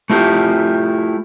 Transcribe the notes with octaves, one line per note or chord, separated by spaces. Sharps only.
A3 E4 F4 G4